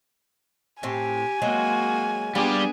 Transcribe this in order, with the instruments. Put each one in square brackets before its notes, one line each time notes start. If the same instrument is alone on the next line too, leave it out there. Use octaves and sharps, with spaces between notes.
[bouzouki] A2 C4 [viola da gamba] G4 [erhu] G#5
[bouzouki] F#3 G#3 C4 [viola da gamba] A#3 F#4
[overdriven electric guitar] G3 G4 [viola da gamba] B3 D4 G#4 [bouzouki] F4